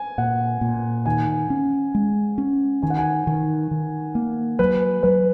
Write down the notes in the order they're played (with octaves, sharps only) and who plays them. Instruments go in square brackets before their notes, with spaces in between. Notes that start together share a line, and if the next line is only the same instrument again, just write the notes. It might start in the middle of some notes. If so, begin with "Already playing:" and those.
Already playing: [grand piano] G#5
[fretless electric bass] A#2 [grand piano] F#5
[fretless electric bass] A#2
[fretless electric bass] D#3 [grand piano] G#5
[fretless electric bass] C#4
G#3
C#4
[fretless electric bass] D#3 [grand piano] G#5
[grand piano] F#5
G#5
[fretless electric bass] D#3
D#3
A#3
[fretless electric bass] F#3 [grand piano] B4
[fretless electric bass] F#3 [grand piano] B4